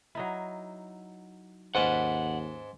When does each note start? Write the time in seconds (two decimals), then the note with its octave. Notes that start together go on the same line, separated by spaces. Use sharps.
0.15 F#3 D#4 E4
1.75 D#2 G#2 C#4 B4 D#5 F#5 A5